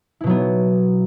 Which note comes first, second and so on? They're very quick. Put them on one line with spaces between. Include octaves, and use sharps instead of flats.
E4 B2 F#3 B3